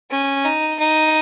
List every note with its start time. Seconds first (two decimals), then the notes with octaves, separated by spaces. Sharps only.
0.11 C#4
0.45 D#4
0.79 D#4